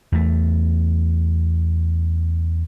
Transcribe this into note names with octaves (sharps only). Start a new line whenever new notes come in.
E2 A3